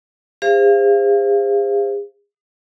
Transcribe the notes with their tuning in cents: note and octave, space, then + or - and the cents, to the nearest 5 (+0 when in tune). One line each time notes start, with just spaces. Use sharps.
G#4 -45 C5 +0 F5 -30